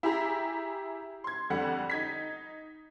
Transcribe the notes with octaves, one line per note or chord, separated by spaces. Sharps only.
E4 G4 G#4 A#5
C6 G#6
F2 D3 G3 F#5
D#4 G#6 B6